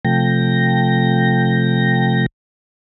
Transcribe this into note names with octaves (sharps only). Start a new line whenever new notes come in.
C3 F3 A3 G5 A#6